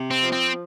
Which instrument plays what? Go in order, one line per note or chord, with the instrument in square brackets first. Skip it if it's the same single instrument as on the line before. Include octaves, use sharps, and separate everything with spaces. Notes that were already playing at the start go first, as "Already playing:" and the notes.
Already playing: [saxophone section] C3
[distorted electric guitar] C4
[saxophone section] F3
[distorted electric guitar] C4